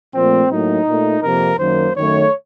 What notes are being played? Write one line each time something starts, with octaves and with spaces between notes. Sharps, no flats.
A#2 F3 A3 C4
A2 F#3 A#3 D#4
A#2 A3
F2 C3 F3 A#3 A#4
F#2 D#3 F#3 A#3 C5
F#2 D#3 A3 C#5